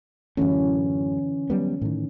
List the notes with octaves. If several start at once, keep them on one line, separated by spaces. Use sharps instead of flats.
F#2 A2 D3 E3 C#4
F#3 G3 B3
A2 D#3